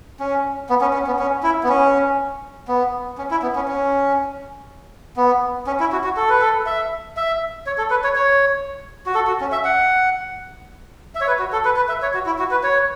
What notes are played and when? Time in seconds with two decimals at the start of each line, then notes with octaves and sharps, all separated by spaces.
0.20 C#4
0.70 B3
0.81 C#4
0.93 C#4
1.07 B3
1.19 C#4
1.43 E4
1.64 B3
1.69 C#4
2.68 B3
3.18 C#4
3.31 E4
3.42 B3
3.56 C#4
3.68 C#4
5.17 B3
5.67 C#4
5.80 E4
5.92 F#4
6.04 F#4
6.17 A4
6.29 B4
6.42 A4
6.66 E5
7.17 E5
7.66 C#5
7.78 A4
7.90 B4
8.04 C#5
8.15 C#5
9.06 F#4
9.15 A4
9.27 F#4
9.41 C#4
9.52 E5
9.65 F#5
11.15 E5
11.21 C#5
11.27 B4
11.39 F#4
11.52 A4
11.65 B4
11.76 B4
11.89 E5
12.02 C#5
12.14 F#4
12.26 E4
12.39 F#4
12.51 B4
12.63 C#5